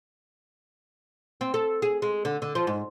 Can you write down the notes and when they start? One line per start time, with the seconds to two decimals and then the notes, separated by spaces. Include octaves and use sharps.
1.41 C4
1.54 A4
1.82 G#4
2.02 G#3
2.25 D3
2.42 D3
2.55 F3
2.67 G#2